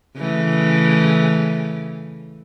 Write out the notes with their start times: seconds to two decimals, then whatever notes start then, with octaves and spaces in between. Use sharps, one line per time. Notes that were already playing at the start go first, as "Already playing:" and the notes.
0.16 C#3 E3 A3